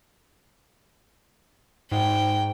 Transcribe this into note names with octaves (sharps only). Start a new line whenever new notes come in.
G#2 G5